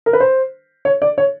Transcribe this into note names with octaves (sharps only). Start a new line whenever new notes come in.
A#4
B4
C5
C#5
D5
C#5